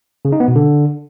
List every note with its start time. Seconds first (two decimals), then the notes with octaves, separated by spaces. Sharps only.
0.25 C#3
0.32 D#4
0.40 B3
0.48 B2
0.56 D3